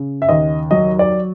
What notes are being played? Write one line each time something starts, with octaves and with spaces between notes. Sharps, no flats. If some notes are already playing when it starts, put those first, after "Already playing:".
Already playing: C#3
E5
D#2 D#5
F#3 D#5
D5